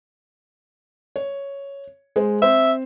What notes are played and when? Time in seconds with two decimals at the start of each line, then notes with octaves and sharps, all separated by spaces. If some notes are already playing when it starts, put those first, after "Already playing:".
1.16 C#5
2.16 G#3 G#4 C5
2.42 C4 C5 E5